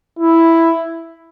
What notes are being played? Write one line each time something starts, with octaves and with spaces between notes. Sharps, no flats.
E4